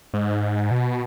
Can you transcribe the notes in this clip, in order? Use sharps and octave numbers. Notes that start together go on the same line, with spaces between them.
G#2
B2